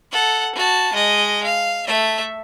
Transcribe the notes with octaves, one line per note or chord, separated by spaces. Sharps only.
A4 F#5
F#4 A5
G#3 D#5
F5
A3 E5